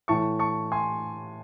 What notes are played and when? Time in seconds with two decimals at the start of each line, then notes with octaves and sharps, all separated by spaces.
0.08 A2 E3 A5 C#6
0.39 A5 C#6
0.72 G#5 C6